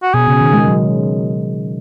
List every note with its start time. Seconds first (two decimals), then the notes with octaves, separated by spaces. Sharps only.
0.03 F#4
0.14 B2 G#4
0.27 C#3
0.41 D#3
0.53 G#3
0.67 F#3